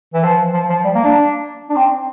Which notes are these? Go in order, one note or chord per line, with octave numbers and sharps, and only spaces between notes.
E3
F3
F3
F3
G3
A#3
D4
D4
C4